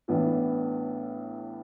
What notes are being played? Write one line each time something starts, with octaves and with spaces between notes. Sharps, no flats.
A1 A2 E3 B3 D4